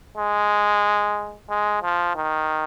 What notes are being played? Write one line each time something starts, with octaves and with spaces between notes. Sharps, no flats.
G#3
G#3
F3
D#3